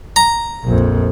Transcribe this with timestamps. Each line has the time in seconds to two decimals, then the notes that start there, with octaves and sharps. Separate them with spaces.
0.16 A#5
0.64 A#1 F2